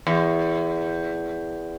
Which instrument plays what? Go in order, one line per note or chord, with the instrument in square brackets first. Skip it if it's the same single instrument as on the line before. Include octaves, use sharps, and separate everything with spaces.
[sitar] E2